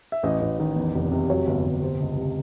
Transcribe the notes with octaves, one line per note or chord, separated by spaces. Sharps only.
E5
A1 D#5
A1
D#3
E2
F1
C3
F#3 C#5
G1
G1
C3 C5
C#2
C3